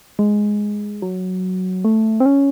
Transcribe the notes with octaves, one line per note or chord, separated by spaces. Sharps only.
G#3
F#3
A3
C4
C#4